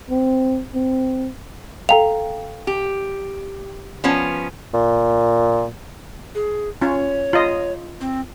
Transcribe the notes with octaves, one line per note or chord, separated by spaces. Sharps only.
C4
C4
A4 F5 G5 A#5 F7
G4
F3 B3 C#4
A#2
G#4
C#4 F4 C#5
F4 D#5
C4